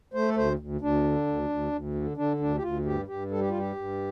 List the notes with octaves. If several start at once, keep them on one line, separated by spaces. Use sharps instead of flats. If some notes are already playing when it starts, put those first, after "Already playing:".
A3 C5
A4
D2 C5
D2
D2 D4
D3
D2
D2
D2
D3
D3 D4
D2 D4
G4
D2 F4
G2 G4
G2 G4
G3 A4
G4
G2 F4
G4
G2